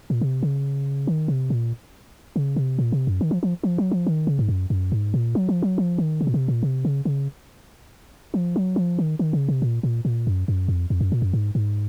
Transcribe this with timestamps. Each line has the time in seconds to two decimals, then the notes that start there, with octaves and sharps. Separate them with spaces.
0.10 A#2
0.21 C3
0.43 C#3
1.07 D#3
1.28 C3
1.50 A#2
2.36 C#3
2.56 C3
2.79 A#2
2.92 C3
3.07 F#2
3.21 D#3
3.31 F3
3.43 F3
3.63 F3
3.78 F#3
3.91 F3
4.07 D#3
4.27 C#3
4.39 G#2
4.49 F#2
4.70 F#2
4.92 G#2
5.14 A#2
5.35 F#3
5.49 F3
5.62 F#3
5.78 F3
5.98 D#3
6.21 C#3
6.27 A#2
6.34 C3
6.48 A#2
6.63 C3
6.85 C#3
7.05 C#3
8.34 F3
8.56 F#3
8.76 F3
8.99 D#3
9.19 D#3
9.33 C#3
9.48 C3
9.62 A#2
9.83 A#2
10.05 A#2
10.27 F#2
10.48 F#2
10.68 F2
10.90 F2
11.01 F#2
11.12 A#2
11.22 F#2
11.33 G#2
11.55 G#2